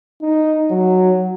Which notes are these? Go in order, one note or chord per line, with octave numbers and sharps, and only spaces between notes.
D#4
F#3